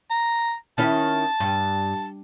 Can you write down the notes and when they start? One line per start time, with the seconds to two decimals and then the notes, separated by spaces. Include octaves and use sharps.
0.10 A#5
0.78 D#3 C#4 E4 A5
1.40 G2